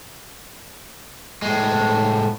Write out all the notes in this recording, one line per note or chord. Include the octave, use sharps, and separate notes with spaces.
A2 G#3